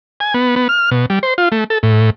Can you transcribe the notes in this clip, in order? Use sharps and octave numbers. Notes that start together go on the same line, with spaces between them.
G#5
B3
B3
F6
B2
G3
C5
F4
A3
A4
A2